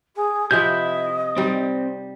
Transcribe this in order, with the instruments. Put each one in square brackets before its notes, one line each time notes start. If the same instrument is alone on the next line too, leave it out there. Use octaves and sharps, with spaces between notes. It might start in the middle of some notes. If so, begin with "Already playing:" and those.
[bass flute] G#4
[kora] C3 F3 [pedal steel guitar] E4 E5 G6 [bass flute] D#5
[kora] G3 D#4 [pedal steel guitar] C4